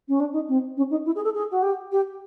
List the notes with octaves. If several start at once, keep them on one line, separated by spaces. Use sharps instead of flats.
C#4
D4
D#4
C4
C#4
D#4
E4
G#4
A4
G#4
F#4
G4
G4